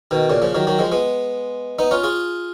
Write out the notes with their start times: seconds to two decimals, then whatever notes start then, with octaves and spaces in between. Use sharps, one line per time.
0.11 B2 D#3
0.30 A#2 C#3
0.42 C#3 F3
0.55 D#3 F#3
0.67 D#3 F#3
0.79 F3 G#3
0.92 G#3 B3
1.79 B3 D#4
1.91 C#4 F4
2.04 F4 G#4